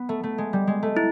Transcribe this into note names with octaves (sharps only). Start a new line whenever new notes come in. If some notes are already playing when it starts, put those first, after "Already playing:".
Already playing: B3
A3
A3
G#3
G3
G#3
A3
E4